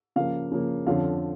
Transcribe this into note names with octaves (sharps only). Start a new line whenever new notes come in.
C#3 F3 A#3 F5
C#3 F3 A#3
F2 D3 F3 C#4 F5